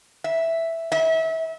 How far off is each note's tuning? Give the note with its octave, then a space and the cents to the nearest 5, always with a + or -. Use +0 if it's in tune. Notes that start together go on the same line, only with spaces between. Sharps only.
E5 +0
E5 -30